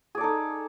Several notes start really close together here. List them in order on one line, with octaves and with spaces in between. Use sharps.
G#4 D5 A4 D#4